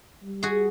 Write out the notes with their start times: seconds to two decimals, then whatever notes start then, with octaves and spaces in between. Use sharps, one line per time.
0.24 G3
0.43 F#4 G#4